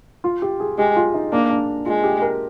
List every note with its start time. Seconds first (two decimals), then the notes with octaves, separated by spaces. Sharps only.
0.24 F4
0.42 G4
0.60 G#4
0.78 G#3 G4
0.96 F4
1.14 D#4
1.32 A#3 D4
1.50 D4
1.86 G#3 F4
2.04 G4
2.22 A#4